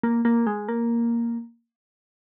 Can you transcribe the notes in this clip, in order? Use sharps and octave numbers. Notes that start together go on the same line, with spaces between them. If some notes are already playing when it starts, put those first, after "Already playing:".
A#3
A#3
G#3
A#3